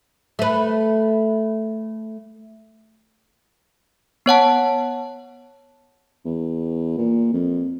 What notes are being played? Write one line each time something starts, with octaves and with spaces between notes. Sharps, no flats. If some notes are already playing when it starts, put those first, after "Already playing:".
A3 B4
B3 C#5 F#5 A5
E2
A#2
F2